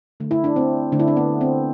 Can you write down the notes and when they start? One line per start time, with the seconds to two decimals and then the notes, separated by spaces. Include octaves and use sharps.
0.20 D3 A3
0.31 E4
0.44 D4
0.56 C4
0.92 D3 A3 D4
1.00 E4
1.08 D4
1.17 B3
1.41 C4